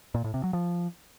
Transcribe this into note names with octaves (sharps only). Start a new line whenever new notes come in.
A#2
A2
C3
F#3
F3